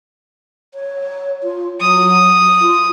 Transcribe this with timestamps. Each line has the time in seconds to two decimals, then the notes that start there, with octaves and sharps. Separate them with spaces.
0.74 C#5
1.43 F4
1.80 F#3 D#6
2.61 F4